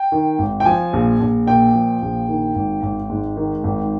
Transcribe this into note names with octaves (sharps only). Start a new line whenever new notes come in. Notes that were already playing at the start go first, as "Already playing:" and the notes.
Already playing: G5
D#3
G#1
G5
F3 G#5
A#1
A#1
A#2 G5
F3
A#1
D#3
G#1
G#1
G#2
D#3
G#1